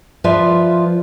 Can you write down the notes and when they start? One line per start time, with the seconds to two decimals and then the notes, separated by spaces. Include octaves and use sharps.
0.24 F3 F4 B4 D5 E5